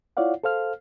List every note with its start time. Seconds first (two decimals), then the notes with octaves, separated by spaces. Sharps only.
0.17 E4 F4 C#5 D5 F5 F#5
0.44 A4 C5 F5 F6